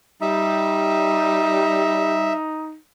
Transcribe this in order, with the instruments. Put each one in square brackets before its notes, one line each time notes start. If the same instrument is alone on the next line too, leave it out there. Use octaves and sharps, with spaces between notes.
[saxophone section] G3 [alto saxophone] D#4 [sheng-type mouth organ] E5